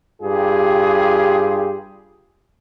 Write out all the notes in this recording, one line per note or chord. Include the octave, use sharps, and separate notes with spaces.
G2 F4 G4 G#4